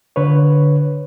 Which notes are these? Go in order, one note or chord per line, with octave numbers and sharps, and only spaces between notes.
D3 B4 C#5